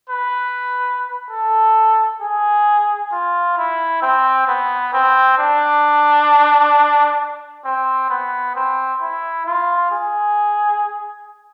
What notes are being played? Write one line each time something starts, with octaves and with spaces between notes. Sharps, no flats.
B4
A4
G#4
F4
E4
C4
B3
C4
D4
C4
B3
C4
E4
F4
G#4